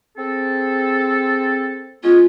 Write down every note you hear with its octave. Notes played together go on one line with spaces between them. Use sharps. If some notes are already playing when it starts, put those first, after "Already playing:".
C4 G#4 A4
G#3 B3 C#4 F4